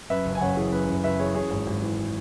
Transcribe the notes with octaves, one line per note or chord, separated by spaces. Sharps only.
F#2 B4 E5
F#1
G#5
F#1 C#5 F#5
E3 G#4
F#2 B4
F#1
F#1 B4 E5
E3 G#4 C#5
F#2 G#4 C#5
G#1
G#1
E3